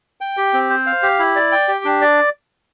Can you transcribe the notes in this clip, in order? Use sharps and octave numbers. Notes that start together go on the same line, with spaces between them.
G5
G4
C4
C5
F5
G4
E4
D5
G5
G4
D4
D5